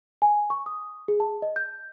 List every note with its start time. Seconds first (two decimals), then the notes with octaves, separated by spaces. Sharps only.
0.22 G#5
0.50 C#6
0.66 D#6
1.08 G#4
1.20 A5
1.42 D#5
1.56 G6